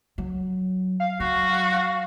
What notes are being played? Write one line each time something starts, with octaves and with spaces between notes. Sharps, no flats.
F#3
F5
F#3 F#4